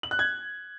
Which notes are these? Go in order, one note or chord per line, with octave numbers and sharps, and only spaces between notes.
F#7
F#6
G#6